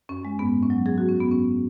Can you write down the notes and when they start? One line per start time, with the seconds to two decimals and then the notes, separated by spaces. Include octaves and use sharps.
0.09 F#2 C#4
0.24 F#2 G#3
0.39 G#2 B3
0.54 G#2
0.63 C#4
0.70 F#3
0.86 F#3 G#4
0.98 F#2 F#4
1.08 C#4
1.16 F#3 B3
1.31 G#2 C#4